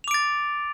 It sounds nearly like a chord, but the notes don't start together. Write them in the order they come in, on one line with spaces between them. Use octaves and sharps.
F7 D6 D7 A6